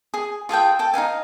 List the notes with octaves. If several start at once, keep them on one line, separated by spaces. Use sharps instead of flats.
G#4
F4 G#4 A4 G5
A4 G5
D#4 E4 F5 G#5